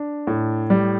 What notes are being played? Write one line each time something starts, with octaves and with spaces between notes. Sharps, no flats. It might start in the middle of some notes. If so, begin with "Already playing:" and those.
Already playing: D4
A2
G3